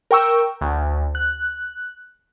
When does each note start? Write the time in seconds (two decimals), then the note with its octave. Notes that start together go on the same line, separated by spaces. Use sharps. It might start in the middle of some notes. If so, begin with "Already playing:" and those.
0.11 A#4 G5 C#6 E6
0.61 D2
1.15 F#6